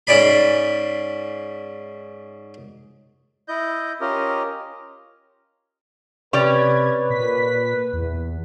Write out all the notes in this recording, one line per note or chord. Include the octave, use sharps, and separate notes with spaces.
G#2 C#4 D5 B5
E4 D#5 G6
C#4 F4 G4 A#4 D#5
C3 C#4 G4 B4 D5 G#6
A#2 B6
E2